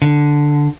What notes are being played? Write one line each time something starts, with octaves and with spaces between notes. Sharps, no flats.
D3